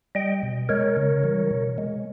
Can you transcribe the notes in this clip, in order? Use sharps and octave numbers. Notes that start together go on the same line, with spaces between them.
G3 D#5 G5
B2
G#3 A#4 C#5
C#3
E3 G3
B2
G#3